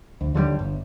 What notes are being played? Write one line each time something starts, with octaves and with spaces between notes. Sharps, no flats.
D2
D#2 D3 E3 G3
G1